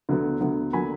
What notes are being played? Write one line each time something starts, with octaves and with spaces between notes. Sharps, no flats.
D2 D3 F#3 B3
D2 D3 F#3 B3
D3 F#3 A#3 G#5 B5